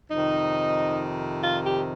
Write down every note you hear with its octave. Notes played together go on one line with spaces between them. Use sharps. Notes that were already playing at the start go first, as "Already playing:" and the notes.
F2 C3 D#3 D#4
F4
G4